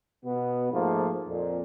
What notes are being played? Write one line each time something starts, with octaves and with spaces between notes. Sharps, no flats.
B2 B3
G#2 F3 A3 A#3
F2 A#2